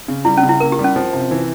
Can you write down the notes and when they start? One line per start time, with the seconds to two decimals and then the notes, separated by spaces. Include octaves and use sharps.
0.08 C#3
0.25 G3 E4
0.37 C#4
0.42 C#3
0.49 E4
0.60 A#3 A#4
0.72 G4
0.79 G3
0.84 C#4
0.96 F3
1.13 C3
1.31 E3